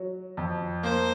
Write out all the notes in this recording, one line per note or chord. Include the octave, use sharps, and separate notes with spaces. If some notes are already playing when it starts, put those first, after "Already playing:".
Already playing: F#3
F2
A#3 C5